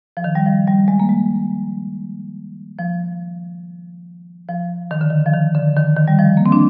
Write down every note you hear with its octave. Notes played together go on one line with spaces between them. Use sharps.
F3
D#3
G3
F3
G3
G#3
A#3
G#3
F3
F3
D#3
D3
D#3
F3
D#3
D3
D#3
D#3
G3
F3
A#3
C4
D4